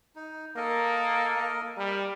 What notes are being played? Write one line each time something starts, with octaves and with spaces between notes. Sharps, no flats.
D#4
A#3 A4 A#4 D#5
G3 A#4